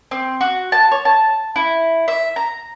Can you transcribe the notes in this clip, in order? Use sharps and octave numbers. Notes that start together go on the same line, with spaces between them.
C4
F#4
A5
C#5
A5
E4
E5
A#5